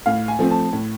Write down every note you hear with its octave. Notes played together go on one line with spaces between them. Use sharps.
A2 F5
G#5
F3 A3 C4
A5
A2